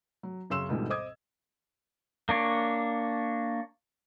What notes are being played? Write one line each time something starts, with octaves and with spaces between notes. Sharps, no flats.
F#3
F#2 C#3 C#4 C6 E6 E7
D2 G#2 B2 D3 E3 G3
C5 D#5 D6 D#6 G#6
A#3 D4 C#5